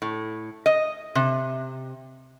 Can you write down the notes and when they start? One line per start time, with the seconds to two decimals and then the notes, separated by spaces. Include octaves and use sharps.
0.02 A2
0.66 D#5
1.15 C3